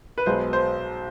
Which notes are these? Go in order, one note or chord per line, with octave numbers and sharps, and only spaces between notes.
B4
B1 B2 G#3 C5
C5